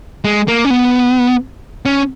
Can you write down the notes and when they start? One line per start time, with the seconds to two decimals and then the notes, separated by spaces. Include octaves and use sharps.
0.24 G#3
0.48 A#3
0.65 C#4
0.70 B3
1.86 C#4